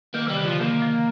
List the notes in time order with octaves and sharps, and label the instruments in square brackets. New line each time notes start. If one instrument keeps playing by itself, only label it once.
[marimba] D#3 [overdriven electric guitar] A#3
[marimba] C3 [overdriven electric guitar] G3
[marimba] D3
[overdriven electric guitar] F3
[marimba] D#3 [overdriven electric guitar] A#3
[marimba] F3